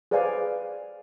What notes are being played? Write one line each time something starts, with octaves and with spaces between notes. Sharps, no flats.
G#4 B4 C5 D5 F5 G#5